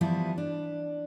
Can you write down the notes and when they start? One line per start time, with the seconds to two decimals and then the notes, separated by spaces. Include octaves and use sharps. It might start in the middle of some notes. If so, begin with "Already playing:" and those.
0.01 E3 F3 G3 B3 E4
0.38 D4